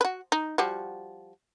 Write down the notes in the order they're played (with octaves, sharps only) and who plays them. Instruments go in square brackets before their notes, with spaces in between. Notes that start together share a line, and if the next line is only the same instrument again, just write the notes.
[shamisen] F#4 B4
D#4
F3 G3 F#4